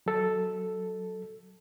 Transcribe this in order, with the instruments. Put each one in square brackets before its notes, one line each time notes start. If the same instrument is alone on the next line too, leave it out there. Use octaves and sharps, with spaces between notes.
[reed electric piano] F#3 A4